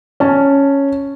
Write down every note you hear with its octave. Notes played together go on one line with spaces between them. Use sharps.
C#4 A5